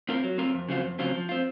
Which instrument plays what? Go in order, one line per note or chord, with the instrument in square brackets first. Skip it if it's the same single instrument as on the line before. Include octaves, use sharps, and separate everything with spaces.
[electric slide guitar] C4 F4 A#4
F#3
C4 F4 A#4
F2
C#3 F#3 C4 F4
F2
C#3 F#3 C4 F4
F3
C4 F4